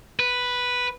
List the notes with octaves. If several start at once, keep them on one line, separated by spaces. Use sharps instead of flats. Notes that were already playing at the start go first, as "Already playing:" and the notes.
B4